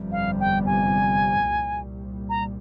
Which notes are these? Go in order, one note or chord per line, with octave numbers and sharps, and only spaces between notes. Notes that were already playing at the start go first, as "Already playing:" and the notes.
Already playing: G1 F2 C3 G3
F5
G5
G#5
C2 A#2 G3
A#5